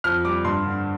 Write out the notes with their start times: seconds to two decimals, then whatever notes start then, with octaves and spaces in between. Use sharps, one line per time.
0.04 F2 F6
0.25 G3 D6
0.45 G2 C6
0.65 D3